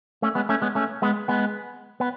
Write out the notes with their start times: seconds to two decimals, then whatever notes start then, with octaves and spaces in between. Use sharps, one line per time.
0.22 A3 C#4
0.35 G#3 B3
0.49 A3 C#4
0.62 G#3 B3
0.75 A3 C#4
1.02 G#3 B3
1.28 G#3 B3
2.00 B3